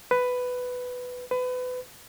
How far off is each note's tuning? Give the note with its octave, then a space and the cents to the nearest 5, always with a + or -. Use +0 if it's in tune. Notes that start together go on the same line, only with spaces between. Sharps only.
B4 +10
B4 +30